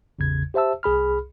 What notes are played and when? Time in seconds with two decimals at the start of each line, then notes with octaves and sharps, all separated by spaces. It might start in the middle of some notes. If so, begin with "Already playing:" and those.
0.19 A1 E2 C#3 G#6
0.54 G4 C5 E5 A5 E6
0.83 C2 G#4 B5 F6